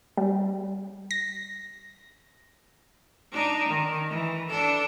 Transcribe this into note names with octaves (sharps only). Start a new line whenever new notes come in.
G3
A#6
D4 D#4
D#3
E3
D4 A4